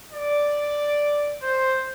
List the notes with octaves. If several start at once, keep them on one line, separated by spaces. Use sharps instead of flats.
D5
C5